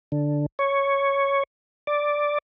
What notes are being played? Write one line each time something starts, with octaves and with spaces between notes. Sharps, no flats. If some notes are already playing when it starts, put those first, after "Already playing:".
D3
C#5
D5